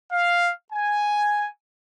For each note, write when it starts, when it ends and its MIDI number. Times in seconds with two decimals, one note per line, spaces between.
0.12 0.51 77
0.73 1.46 80